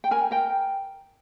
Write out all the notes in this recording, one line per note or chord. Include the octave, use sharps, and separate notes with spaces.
G5
A#4 G#5
A#4 G5